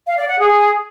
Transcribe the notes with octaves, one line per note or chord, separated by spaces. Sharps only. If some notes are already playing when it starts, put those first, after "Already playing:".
F5
D5
F#5
G#4